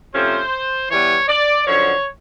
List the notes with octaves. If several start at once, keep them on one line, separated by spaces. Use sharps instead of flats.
C3 F3 A3 C#4 C5
E3 G3 B3 C#5
D5
F#2 D3 F3 C#5